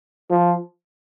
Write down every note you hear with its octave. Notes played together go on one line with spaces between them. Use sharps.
F3